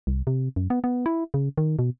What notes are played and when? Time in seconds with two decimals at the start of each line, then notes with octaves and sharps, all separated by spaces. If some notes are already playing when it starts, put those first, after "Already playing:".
0.07 C2
0.27 C3
0.56 F#2
0.70 B3
0.84 B3
1.06 E4
1.34 C#3
1.58 D#3
1.79 B2